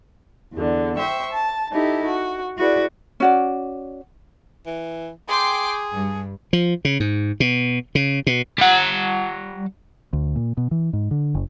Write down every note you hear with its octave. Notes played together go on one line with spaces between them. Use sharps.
E2 D3
C5 E5 G5 C#6
A5
D#4 E4 G4 A4
F#4
E4 F#4 G#4 B4 D5
C#4 F#4 D5
E3
G#4 G5 C6 D6
G2
F3
C#3
G#2
B2
C#3
B2
G3 F#5
D2
A#2
B2
E3
G#2
D3
F#1